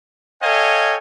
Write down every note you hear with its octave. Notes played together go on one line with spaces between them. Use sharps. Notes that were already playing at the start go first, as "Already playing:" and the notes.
A4 C#5 D#5 F5 G5 G#5